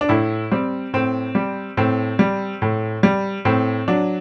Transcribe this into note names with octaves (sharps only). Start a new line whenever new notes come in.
D4
A2 E4
G3 C4
A2 C4
G3
A2 C4
G3
A2
G3
A2 C4
F#3 D4